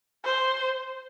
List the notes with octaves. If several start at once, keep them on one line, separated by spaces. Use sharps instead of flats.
C5